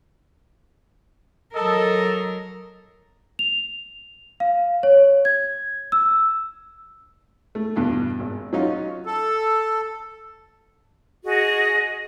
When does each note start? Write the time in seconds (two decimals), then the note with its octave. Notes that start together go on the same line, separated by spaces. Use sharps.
1.54 F#3 A4 A#4 D#5
3.39 F7
4.40 F5
4.83 C#5
5.25 G#6
5.92 E6
7.55 A3
7.76 E2 G2 B2
8.19 G#1
8.53 F#3 C#4 D#4 F4
9.05 A4
11.25 F#4 G#4 D#5